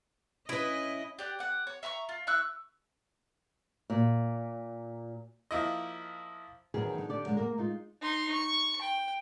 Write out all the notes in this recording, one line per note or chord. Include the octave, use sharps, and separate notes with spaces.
C#4 E4 B4 D#5
G4 D5 F#5
D5 F#5
C#5
E5 A#5 C6 C#6
F4
E4 C#6 E6 F#6
A#2
F3 A#3 E4 D#5
E2 D#3 F#3 G#4 B4 G#5
D3 D#4
D3 G4 D5
F#2 D3 G#3
A#3 A#4
G#3 D#4 F4
D#4 C6
C#6
G5